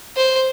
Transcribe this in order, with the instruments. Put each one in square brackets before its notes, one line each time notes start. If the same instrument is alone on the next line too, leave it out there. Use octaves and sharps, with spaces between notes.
[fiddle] C5